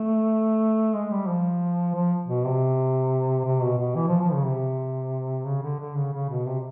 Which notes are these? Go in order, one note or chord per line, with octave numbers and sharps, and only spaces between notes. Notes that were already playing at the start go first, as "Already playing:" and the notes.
Already playing: A3
G#3
G3
F3
F3
B2
C3
C3
B2
B2
E3
F3
F3
C#3
C3
C#3
D3
D3
C#3
C#3
B2
C3